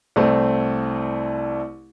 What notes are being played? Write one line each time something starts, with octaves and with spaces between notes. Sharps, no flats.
C2 A3 C4